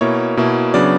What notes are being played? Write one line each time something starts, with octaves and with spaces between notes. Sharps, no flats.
B2 A#3 E4 C#5
B2 A#3 E4
C#3 F#3 B3 D4 D5